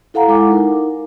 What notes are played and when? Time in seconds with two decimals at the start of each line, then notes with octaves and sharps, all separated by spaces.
0.14 E4 A4 F5 F#5 A#5
0.28 G#3 E4 A4 G#5 D6
0.48 D#4 A#4